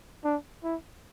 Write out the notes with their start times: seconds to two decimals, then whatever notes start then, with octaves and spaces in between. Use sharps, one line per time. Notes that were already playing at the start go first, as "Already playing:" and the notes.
0.25 D4
0.64 E4